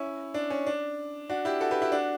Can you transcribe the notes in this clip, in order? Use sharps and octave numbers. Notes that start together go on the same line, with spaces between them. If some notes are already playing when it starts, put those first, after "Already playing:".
Already playing: C#4 E4
D4
C#4
D4
D4 F#4
E4 G4
F#4 A4
G4 B4
E4 G4
D4 F#4